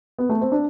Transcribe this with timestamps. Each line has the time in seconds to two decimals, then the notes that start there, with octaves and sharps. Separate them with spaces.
0.18 B3
0.29 A3
0.41 C4
0.52 D4